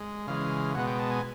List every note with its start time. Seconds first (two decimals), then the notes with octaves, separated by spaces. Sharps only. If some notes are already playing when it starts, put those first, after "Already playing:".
Already playing: G#3
0.27 C#3 E3 G#3 F5
0.75 B2 G#3 B3 F#5
0.87 G5
0.99 A5
1.11 G#5